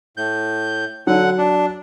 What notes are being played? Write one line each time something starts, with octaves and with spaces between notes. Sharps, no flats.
A2 G6
D3 F#3 F#5
D4